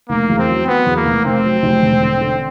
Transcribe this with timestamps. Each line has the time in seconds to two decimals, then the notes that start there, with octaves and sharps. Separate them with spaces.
0.09 F1 A#3
0.29 E2
0.39 C4
0.48 F#3
0.67 F#3 B3
0.86 E2
0.97 A#3
1.06 F1
1.25 F1 C4
1.44 F#3
1.63 F1
1.82 E1
2.02 D3
2.20 D3